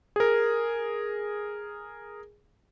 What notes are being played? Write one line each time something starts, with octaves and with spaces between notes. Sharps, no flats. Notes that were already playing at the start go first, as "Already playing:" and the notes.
G#4 A#4